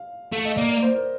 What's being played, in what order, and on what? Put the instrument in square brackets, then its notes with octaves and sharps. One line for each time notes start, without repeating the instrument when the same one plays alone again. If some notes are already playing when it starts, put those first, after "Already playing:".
Already playing: [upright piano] F5
[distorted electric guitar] A3 [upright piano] F5
[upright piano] D#5
[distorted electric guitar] A#3 [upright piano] D5
[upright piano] D5
C5
A#4